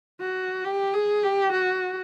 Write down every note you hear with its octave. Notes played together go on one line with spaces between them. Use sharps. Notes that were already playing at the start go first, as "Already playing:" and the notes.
F#4
G4
G#4
G4
F#4